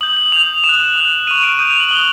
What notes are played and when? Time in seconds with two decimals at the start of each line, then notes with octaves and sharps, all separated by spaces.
0.01 D#6 G6 F#7
0.17 F#7
0.32 D#6 G6 F7
0.64 D#6 E7
0.69 F#6
0.95 D#6 F#6
1.27 C#6 F6 D#7
1.43 D7
1.59 D#6 G6 D#7
1.70 F7
1.80 F#7
1.91 D#6 F#6 G7